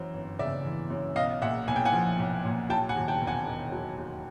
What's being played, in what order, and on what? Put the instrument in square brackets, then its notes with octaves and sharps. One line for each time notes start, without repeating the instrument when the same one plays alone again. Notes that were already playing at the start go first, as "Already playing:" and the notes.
Already playing: [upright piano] F#2 E3 C5
G1
C#3 D5 E5
E3
F#2
B1 D#5 F5
A#2 E5 F#5
B1 G#5
G5
F#5 G#5
F3
B1
A#2
F#3 G5 A5
F#5 G#5
D#2
G5 A5
E1
F#5 G#5
D#3
F#3
D#2